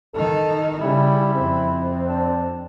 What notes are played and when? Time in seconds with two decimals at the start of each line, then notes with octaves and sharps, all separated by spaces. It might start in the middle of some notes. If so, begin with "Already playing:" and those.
0.14 D#3 D#4 A4
0.81 C#3 G3 E4
1.35 F2 C4
2.09 D4